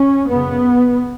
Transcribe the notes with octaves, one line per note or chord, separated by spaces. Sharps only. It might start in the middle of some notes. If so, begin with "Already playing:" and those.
Already playing: C#4
F#2 C#3 B3